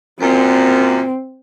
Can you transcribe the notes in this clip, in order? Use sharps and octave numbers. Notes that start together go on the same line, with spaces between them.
F#2 A#2 C4